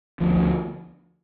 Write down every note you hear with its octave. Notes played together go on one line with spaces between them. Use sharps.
D2 F3
D2